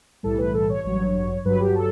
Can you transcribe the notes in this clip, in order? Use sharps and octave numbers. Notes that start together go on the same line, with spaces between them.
B1 A2 E3 G3 A4
B4
A4
C#5
A1 G2 F#3 C#5
G1 G2 F#3 B4
G4
A4